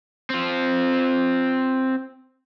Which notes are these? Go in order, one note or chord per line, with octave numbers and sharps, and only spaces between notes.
C4 F4